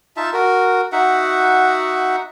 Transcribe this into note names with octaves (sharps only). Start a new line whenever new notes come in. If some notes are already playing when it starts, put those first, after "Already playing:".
D#4 F4 E5 A5
F#4 A#4
D#4 F#4 E5 F#5